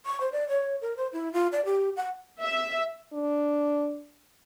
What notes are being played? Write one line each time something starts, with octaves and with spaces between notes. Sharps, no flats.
C#6
C5
D5
C#5
A#4
C5
E4
F4
D5
G4
F#5
E5
D4